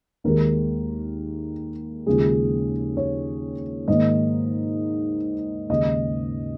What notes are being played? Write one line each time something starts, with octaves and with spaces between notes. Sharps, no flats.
D#2 D#3 G#3 A#4
D#2 C#3 F3 G#3 G#4
C#5
G#2 D#3 A#3 D#5
D#2 C#3 G#3 D#5